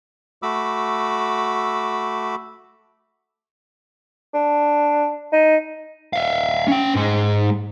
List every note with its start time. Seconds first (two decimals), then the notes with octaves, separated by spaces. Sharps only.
0.42 A3 F#4 B5 D6 E6
4.34 D4
5.32 D#4
6.13 E5 F5
6.68 C#4 G5
6.95 G#2 G#3